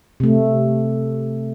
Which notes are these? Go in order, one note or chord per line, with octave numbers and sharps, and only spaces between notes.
C3 A3